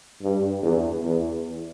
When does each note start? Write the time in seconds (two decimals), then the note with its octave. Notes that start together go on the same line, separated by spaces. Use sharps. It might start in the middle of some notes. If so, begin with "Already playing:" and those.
0.22 G2
0.62 E2
1.04 E2